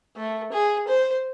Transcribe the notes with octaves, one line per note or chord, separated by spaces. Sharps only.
A3
G#4
C5